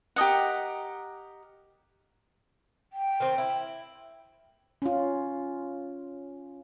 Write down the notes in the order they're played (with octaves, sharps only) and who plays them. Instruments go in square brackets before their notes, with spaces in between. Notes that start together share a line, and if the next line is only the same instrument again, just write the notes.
[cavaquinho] G4 A#4 D#5 F#5
[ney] G5
[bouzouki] D#3 C4
E4
[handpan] C#4 F4